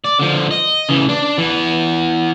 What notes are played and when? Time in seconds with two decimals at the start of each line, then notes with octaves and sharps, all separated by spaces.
0.04 D5
0.19 D3 F3
0.51 D#5
0.89 C#3 E3
1.09 D4
1.38 E3 B3